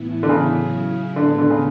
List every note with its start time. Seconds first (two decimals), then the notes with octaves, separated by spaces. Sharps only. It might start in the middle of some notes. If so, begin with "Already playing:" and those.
Already playing: A2 E3 B3 E4
0.23 D3
0.29 C#3
0.51 F#3 C#4 E4 G#4
1.16 A2 D3 G#3 B3
1.38 D3
1.50 C#3